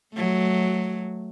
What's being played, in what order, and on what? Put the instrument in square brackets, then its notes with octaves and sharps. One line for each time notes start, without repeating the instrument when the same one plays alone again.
[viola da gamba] F#3 A3